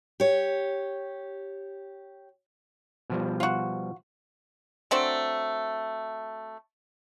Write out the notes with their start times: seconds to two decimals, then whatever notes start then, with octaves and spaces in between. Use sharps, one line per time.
0.20 G4 C#5
3.10 B2 F3 G3
3.40 F4 F#4
4.91 F#3 A3 C4 D4